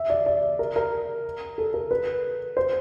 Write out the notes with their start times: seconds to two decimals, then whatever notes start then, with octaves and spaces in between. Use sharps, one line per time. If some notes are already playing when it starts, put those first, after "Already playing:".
Already playing: E5
0.10 D5
0.26 D5
0.59 A#4
0.76 A#4
1.58 A4
1.74 A#4
1.91 B4
2.57 C5